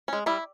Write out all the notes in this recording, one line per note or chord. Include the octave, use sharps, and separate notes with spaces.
G#3 C#4
G3 E4